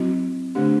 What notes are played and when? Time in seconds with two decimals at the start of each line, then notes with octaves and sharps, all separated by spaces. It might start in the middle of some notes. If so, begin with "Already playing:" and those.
Already playing: F#3 C4 E4 F#4
0.55 D3 A3 D4 G4